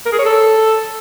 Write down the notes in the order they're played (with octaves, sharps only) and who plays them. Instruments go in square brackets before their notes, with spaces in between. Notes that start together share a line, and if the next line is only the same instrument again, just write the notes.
[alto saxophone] A#4
G#4
C#5
A4